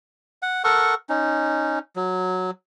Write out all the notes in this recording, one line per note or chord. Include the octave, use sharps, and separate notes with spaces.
F#5
A4 A#4 F#5 C#6
C#4 D#4
F#3